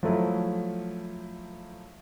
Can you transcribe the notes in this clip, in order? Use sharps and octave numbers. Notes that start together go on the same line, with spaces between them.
F3 F#3 A3 E4